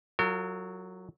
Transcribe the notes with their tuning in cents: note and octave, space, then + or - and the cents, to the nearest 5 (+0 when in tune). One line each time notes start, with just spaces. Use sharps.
F#3 +0 F4 -15 A#4 -45